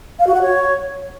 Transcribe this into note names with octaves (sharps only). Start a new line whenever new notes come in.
F5
F#4
F#5
C#5